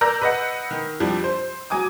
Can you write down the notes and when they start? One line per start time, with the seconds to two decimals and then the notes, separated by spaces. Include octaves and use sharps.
0.01 A#4 D5 E6 G6 A#6
0.22 B4 D#5 F#5
0.71 D#3
1.00 F2 F3 G3 D4
1.24 C5
1.70 F#3 G#5 D6 D#6